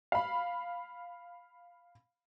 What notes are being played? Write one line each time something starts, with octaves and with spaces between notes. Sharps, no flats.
F5 B5